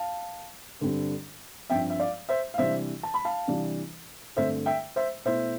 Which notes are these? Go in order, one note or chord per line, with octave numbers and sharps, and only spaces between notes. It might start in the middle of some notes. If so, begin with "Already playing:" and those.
Already playing: F5 A5
G2 D3 G3 C4
G2 F3 C4 E5 G5
E5
D5 F5
C5 E5
F5
C3 E3 G3 D4 C5 E5
A5
B5
F5 A5
C3 E3 G3 D4
G2 D3 A3 C4 C5 E5
E5 G5
C5 E5
B2 A3 E4 C5 E5